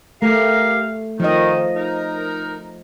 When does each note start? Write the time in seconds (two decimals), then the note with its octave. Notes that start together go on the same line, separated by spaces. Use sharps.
0.22 A3 G4 A#4 F5
1.20 D#3 F3 D#5
1.76 D#4 A#4